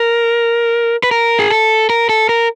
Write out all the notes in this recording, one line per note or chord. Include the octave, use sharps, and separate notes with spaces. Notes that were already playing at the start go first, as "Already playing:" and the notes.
Already playing: A#4
B4
A#4
G#4
A4
A#4
A4
A#4